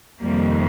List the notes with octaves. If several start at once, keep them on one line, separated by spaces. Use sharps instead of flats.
F2 C3 D#3 G3 A#3